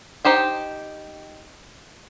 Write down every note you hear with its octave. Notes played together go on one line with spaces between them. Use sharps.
D#4 G4 C5 G5